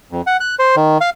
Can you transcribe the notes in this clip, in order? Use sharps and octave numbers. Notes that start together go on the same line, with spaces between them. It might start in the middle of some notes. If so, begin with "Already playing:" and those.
F2
F#5
F#6
C5
D#3
F5